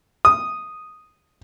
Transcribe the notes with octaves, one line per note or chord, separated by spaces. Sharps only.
D#6